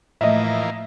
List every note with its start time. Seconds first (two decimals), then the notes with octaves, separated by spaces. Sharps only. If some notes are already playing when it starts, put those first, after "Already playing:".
0.21 A2 E3 F3 A3 A#3 D#5 E5